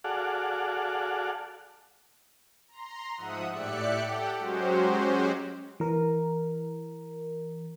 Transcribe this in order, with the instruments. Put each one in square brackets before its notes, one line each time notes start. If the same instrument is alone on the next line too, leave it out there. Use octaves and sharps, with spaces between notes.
[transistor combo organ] F#4 G#4 A4 D5 F5 F#5
[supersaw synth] A#5 C6
G#2 F3 E5 F#5 D#6
A2 G4 D5 E5 F#6 C#7
G4 A4 F#5 G5
F#3 G#3 C#4 F#4 G4 C5
[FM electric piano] E3 A#4